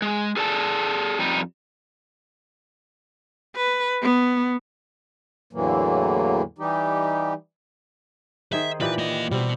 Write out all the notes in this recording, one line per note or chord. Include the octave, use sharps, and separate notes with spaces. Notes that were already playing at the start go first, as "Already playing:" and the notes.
G#3
G#4 A4 D5 G#5 A5
F2 G3 D#4
B4
B3
E2 A2 D3 E3 F#3 A#3
E3 G3 D#4 G4
D#3 G#4 C5 E5
A#2 E3 G4 B4
A#3 D#5
B2 G3 C4